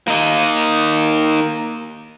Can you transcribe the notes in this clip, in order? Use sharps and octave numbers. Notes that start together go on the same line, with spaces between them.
A#3 D#4